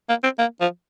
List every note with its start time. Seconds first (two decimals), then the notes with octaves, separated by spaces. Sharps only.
0.09 A#3
0.23 C4
0.39 A#3
0.60 F3